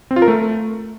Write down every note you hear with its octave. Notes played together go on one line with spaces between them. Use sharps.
C4
F4
A#4
A3